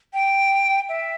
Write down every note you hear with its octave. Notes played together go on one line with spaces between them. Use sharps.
G5
E5